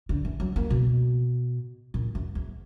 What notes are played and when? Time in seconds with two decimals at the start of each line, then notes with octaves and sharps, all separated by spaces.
0.09 D3
0.25 E3
0.40 F#3
0.56 A#3
0.70 B2
1.94 A#2
2.15 F#2
2.35 E2